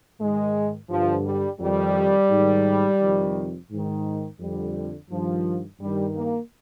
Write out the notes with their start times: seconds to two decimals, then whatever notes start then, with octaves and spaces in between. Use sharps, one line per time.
0.20 G#2 D#3 G#3
0.90 G2 D3 F3
1.25 G3
1.60 F2 D#3 G3
2.30 G#2 D#3
3.00 F2 C3 D#3
3.71 G#2 D#3
4.40 F2 D3 G3
5.10 G2 D#3 F3
5.80 G2 D#3 G3
6.15 A#3